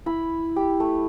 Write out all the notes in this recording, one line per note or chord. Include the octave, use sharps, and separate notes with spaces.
E4 B5
G4
A3